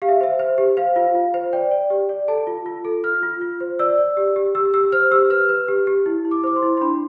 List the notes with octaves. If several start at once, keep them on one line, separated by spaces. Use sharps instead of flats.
G4 F5
E5
C5 E5
C5
G4
C5 F5
F4
F4
C5
D5 G5
D5
G4
D5
A4 A5
F4
F4
A4
F4 F6
F4
F4
C5
D5 E6
D5
G4
G4
G4 E6
G4 E6
C5 F6
G4 E6
B4 F6
B4
G4
G4
E4
E4
D6
C5 D6
C6
E4
C6
D4 B5